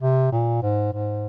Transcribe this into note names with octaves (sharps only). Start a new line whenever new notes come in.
C3
A#2
G#2
G#2